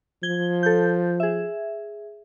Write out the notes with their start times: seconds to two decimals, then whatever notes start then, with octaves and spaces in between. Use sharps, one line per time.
0.23 F3 G#6 G7
0.63 A4 G6
1.20 G#4 E5